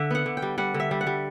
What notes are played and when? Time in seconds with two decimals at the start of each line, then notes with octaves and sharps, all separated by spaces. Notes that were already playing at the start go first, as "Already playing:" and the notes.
Already playing: D3 E5
0.11 B3 F#5
0.26 D3
0.37 G5
0.42 G3
0.58 G3 F#5
0.74 D3
0.80 E5
0.91 G3
1.01 F#5
1.07 G3